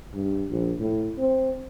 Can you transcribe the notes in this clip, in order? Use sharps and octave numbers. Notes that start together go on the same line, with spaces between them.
G2
A#1
A2
C4